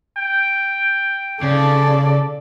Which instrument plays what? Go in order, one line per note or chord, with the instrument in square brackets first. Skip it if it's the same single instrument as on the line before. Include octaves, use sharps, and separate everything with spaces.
[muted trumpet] G5
[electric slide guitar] C#3 [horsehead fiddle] A4 D5